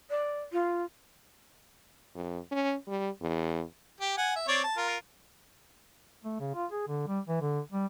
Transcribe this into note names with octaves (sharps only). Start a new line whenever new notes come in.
D5
F4
F2
C#4
G3
E2
G4
F#5 G#5
E5
C4 C#5 D5
A5
F4 A#4
A3
C#3
F4
G#4
D3
G3
E3
D3
G3